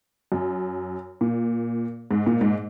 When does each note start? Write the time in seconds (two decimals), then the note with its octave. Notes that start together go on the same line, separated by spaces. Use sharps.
0.32 F#2
1.21 A#2
2.11 G#2
2.26 A#2
2.41 G#2